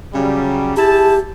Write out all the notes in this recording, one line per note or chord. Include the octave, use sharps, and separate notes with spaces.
C#3 F#3 G3
E4 G4 G#4 A5